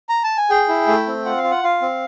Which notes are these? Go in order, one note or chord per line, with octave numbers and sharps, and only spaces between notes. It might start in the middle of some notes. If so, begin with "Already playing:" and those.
A#5
A5
G#5
G#4 G5
E4
A3
C4
F4 F#5
F5
F4
F#5
F4 F5
C4